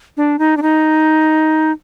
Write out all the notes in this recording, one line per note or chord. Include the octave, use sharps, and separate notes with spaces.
D4
D#4
D4
D#4